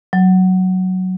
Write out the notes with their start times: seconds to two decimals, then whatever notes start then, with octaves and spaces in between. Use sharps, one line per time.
0.13 F#3